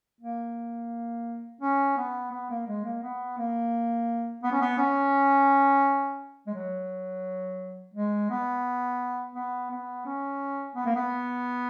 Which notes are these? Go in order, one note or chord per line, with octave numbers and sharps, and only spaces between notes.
A#3
C#4
B3
B3
A#3
G#3
A#3
B3
A#3
B3
C#4
B3
C#4
G#3
F#3
G#3
B3
B3
B3
C#4
B3
A#3
B3